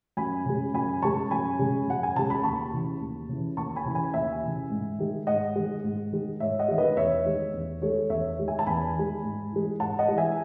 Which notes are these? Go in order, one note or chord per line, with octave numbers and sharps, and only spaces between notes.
F#2 G#5 B5
C#3 G#3
F#2 G#5 B5
C#3 G#3 A5 C#6
F#2 G#5 B5
C#3 G#3
F#2 F#5
G#5
C#3 G#3 A5
B5
D#2 A5 C#6
C#3 E3
D#2
C#3 E3
D#2 A5 C#6
G#5 B5
C#3 E3
G#5 B5
D#2 E5 G#5
C#3 E3
G#2
D#3 G#3
G#2 D#5 F#5
D#3 G#3
G#2
D#3 G#3
G#2 C#5 E5
D#5 F#5
D#3 G#3 E5
B4 D#5
E2 C#5 E5
D#3 G#3
E2
D#3 G#3 A4 C#5
E2 C#5 E5
D#3 G#3
E5 G#5
A5
E2 G#5 B5
D#3 G#3
G#2
E3 G#3
G#2 F#5 A5
D#5 F#5
E3 G#3
E5 G#5